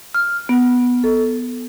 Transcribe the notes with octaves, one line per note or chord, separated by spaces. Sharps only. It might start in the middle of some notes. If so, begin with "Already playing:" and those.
F6
B3
A4